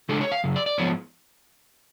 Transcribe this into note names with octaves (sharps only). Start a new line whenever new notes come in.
C#3 G#3 D4 A4
C#5
F5
F#2 C#3
D5
D5
G#2 F3 B3 C#5